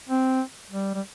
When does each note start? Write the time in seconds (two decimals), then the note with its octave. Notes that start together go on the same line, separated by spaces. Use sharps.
0.09 C4
0.71 G3
0.95 G3